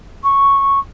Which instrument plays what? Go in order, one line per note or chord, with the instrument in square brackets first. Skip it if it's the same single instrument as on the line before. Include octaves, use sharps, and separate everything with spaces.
[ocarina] C#6